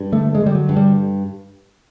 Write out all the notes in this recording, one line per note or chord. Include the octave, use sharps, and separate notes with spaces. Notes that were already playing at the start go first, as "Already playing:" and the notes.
Already playing: G2
D3 A3
G#3
D3
G3
F#3
G2
G3